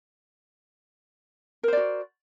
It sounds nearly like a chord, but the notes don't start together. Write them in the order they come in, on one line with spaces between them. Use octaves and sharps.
A#4 C5 D5 F#4